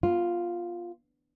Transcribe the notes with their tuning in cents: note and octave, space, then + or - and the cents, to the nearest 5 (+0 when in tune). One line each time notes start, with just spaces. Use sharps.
B3 -25 F4 +0